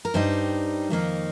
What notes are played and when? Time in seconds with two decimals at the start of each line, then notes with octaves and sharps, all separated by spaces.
0.05 A#4
0.14 G2 G3 D#4 C5
0.90 F2 D#3 A#3 D#4